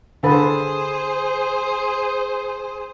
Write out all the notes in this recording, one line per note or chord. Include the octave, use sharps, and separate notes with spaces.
D3 G#4 A4 B4 C5